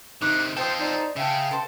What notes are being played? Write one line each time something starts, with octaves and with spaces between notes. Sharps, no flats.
C3 D#3 D#4 D6 F#6
F4 A4 C5 D#5 G5
D#4 C5 D5
C#3 E5 F5 G5 A5
A4 C5